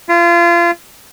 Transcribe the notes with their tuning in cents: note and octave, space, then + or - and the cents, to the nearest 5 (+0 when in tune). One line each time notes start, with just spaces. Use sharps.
F4 -30